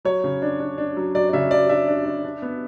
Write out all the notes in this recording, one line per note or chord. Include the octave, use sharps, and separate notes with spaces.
F#3 C#5
C#3
D4
D4
D4
F#3
F#3 D5
D5
C#3 E5
F#3 D5
D4 E5
D4
D4
D4
B3